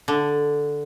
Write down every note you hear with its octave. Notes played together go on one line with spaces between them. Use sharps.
D3